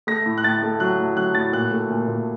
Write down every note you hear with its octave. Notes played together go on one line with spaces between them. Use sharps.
A3 A#6
A2
F#6
A2 A6
A3
F#3 F#6
A2
F#3 F#6
A2 A6
A#2 F#6
A3
A#2
A#2